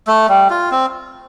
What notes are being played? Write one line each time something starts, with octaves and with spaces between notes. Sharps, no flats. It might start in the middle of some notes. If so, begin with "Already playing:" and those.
A3
G3
F4
C4